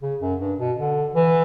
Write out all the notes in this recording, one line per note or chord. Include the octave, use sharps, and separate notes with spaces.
C#3
F#2
G2
B2
D3
E3